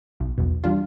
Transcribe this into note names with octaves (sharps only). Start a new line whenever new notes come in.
B1
B1 E2 B2
E3 G3 D4 F4